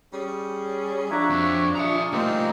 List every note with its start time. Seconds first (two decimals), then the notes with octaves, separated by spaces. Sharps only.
0.13 G3 C#4 G#4
1.11 F3 D4 F#4 C#5 E5 A#5
1.30 F2 C#6
1.75 F4 G#4 E5 A#5 C#6
2.13 G3 A3 A#3 C4 D#4